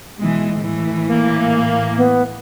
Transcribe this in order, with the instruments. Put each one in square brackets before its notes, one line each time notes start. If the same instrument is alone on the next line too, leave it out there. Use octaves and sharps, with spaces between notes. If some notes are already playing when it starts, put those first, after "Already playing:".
[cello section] B2 E3 G#3
A2 E3
[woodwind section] A#3
[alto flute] B3